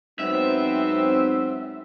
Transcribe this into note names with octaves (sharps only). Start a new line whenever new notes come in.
G#2 F#3 B3 C4 E5